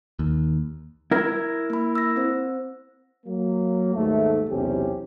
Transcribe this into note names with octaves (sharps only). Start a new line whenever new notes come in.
D#2
E4 A#4 E6 F6 G#6
A#3 B5
E6 A#6
C4 C5
F#3 A#3
D#2 G#2 A3
B1 E2 C3 C#4 G4